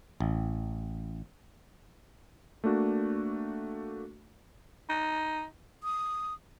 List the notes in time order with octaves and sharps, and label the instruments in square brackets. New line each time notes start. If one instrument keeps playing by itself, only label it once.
[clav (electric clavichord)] A1
[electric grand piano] A3 A#3 D4 F#4
[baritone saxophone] D#4
[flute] D#6